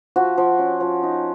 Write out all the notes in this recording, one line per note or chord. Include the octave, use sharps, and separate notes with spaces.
F3 F#4
F3
C#4
F3
D#4